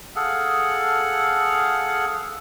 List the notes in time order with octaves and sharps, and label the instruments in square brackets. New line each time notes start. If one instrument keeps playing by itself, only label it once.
[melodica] G#4 A4 F5 F#5